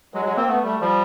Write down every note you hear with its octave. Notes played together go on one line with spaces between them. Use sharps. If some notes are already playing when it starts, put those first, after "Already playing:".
F#3 G#3
F#3 G#3
A#3 C4
A3 B3
G3 A3
F3 G3